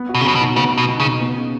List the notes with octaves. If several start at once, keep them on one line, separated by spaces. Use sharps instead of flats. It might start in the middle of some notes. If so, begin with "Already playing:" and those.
Already playing: B3
F#4
B2
C#3
B2 F#3
B2
D#4
C#3 B3
F#4
B2
B2
C#3
D#4
B3
C#3